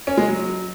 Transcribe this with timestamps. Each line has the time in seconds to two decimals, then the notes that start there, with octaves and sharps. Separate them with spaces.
0.07 C#4
0.17 G#3
0.28 F#3